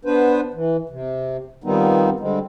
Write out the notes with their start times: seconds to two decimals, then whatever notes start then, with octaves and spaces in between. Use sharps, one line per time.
0.05 B3 D4 B4 C5
0.54 E3
0.89 C3
1.64 D#3 F3 G3 B3 C4 D#4
2.20 D3 G3 G#3 C4